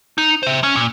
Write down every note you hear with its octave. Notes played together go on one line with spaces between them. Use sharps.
D#4
C5 E5
C#4
A#2